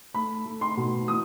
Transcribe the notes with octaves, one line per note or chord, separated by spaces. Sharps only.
A3 B5
A3
C6
B2
E3 D#6